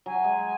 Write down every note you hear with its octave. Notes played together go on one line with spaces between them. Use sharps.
F#3 G#5
G#3